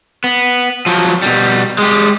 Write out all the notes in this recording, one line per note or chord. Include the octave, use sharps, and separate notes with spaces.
B3
F3 F#3
B2 G3
G#3 G4